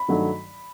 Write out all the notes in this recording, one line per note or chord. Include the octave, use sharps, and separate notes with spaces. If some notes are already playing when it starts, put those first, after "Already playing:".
Already playing: B5
G2 D#3 F#3 A3